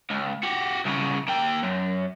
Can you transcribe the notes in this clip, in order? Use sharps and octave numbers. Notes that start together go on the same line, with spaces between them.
C#2
F#4 G4
C2 C#3
A#3 G5
F#2